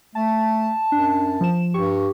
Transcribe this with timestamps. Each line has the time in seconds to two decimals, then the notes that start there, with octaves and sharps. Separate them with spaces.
0.15 A3 A5
0.92 F#2 D4
1.41 F3 E7
1.74 G2 G4 C#6